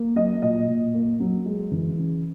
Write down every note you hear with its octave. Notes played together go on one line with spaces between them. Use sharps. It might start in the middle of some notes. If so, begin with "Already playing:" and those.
Already playing: A#3
F#3 D#5
A#2 D#5
A#2
A#3
F#3
G#3
E3
C#3